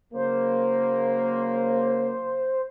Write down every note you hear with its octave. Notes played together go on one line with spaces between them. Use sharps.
C#3 F#3 A#3 C5